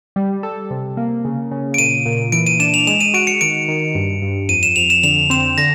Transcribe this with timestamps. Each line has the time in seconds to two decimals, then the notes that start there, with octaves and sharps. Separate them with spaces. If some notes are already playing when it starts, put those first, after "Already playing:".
0.16 G3
0.43 A4
0.71 C3
0.97 A#3
1.25 C#3
1.51 C#3
1.74 D7
1.78 A#2 D#7
2.06 A#2
2.32 E3 D7
2.47 D#7
2.60 D4 E7
2.74 F7
2.87 G#3 E7
3.01 D#7
3.14 F#4 D7
3.27 C#7
3.41 D#3 D7
3.68 D#3
3.95 G2
4.22 G2
4.49 F2 D#7
4.63 E7
4.76 F2 F7
4.90 E7
5.03 D3 F7
5.30 C4 E7
5.58 D3 A#6